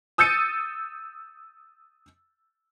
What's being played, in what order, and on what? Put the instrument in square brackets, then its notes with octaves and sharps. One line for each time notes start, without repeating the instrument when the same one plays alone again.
[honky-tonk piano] D#6 E6 G6 A6 C#7 D#7